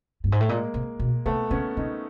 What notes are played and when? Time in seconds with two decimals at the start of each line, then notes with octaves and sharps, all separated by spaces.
0.24 G2
0.32 G#2
0.40 A2
0.49 A#2 G#3 A#3
0.74 C3
0.99 B2
1.26 C3 A3 B3
1.51 C#3 B3 C#4
1.77 C#3 C#4 D#4